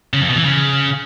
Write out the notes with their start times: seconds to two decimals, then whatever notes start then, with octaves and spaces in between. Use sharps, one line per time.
0.13 C#3
0.21 F2
0.29 B2
0.36 E3
0.44 C#3